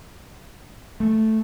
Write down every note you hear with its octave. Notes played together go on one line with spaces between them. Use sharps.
A3